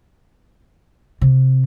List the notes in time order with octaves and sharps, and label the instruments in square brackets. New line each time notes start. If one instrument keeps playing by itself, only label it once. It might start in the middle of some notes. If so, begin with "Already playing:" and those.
[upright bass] C3